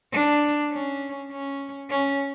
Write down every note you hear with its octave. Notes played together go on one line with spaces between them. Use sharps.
D4
C#4
C#4
C#4